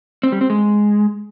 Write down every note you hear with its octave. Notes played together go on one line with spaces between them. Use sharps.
C4
G3
C4
G#3